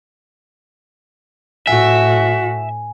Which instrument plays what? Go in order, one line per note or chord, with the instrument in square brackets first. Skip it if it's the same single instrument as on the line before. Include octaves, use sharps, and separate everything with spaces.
[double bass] A2 [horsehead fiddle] F#4 [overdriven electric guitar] E5 [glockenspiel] G#5